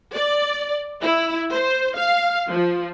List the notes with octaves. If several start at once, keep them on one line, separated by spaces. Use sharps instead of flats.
D5
E4
C5
F5
F3